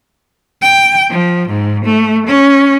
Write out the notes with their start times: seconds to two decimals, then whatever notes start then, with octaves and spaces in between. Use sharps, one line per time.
0.63 G5
1.10 F3
1.48 G#2
1.86 A3
2.27 C#4